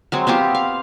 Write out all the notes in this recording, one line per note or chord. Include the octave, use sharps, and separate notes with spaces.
F#3 G#3 C4
B3 C4 F4 G4
F5